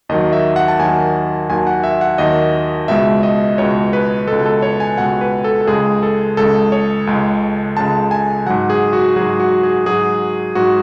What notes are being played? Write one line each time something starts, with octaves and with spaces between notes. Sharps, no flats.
D#2 D#3 F#3 D#5
E5
F#5
A5
D#2 D#3 F#3 G#5
D#2 D#3 F#3 G#5
F#5
E5
F#5
D#2 D#3 F#3 D#5
C#2 B2 G#3 E5
D#5
C#2 B2 G#3 C#5
B4
C#2 B2 G#3 A4
A4
C#5
G#5
C#2 B2 G#3 F#5
B4
A4
A4
C#2 C#3 G#3 G#4
A4
C#2 C#3 G#3 A4
C#5
C#2 C#3 G#3
C#2 C#3 G#3 A5
G#5
G#2 F#3 F#5
G#4
F#4
G#2 F#3 G#4
F#4
G#4
G#2 F#3 G#4
G#2 F#3 F#4